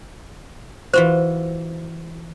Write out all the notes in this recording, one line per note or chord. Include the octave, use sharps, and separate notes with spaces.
E3 F4 F#4 C5